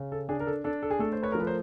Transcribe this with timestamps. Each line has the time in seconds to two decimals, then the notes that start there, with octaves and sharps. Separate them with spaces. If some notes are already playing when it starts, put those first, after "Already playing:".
Already playing: C#3
0.12 A4
0.29 D4 G#4
0.40 A#4
0.47 A4
0.64 D4 A4
0.82 A4
0.90 G#4
0.99 A3 A4
1.13 C5
1.23 B4 C#5
1.32 A#4
1.35 F3 B4
1.47 A#4 C5